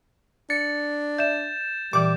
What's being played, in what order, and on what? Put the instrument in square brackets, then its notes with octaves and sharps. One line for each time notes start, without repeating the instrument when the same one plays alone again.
[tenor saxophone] D4 [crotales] A6 [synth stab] C#7
[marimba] D5 E5 [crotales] G6 E7
[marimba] A#2 E3 D5 [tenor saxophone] G3 [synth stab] D6